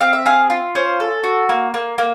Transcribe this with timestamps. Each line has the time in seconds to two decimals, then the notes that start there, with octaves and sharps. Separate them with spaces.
0.01 C4 F5
0.13 E5
0.26 G#4 F5
0.50 F4
0.75 C#4 C5
1.00 A4
1.23 F#4
1.49 A#3
1.74 A#3
1.98 A#3